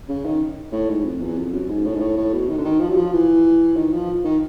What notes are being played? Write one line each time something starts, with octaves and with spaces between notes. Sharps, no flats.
C#3
D#3
A2
G#2
F2
E2
F2
F#2
G#2
A2
G#2
A2
A2
B2
D#3
D3
D#3
F3
F#3
F3
E3
D#3
F3
D#3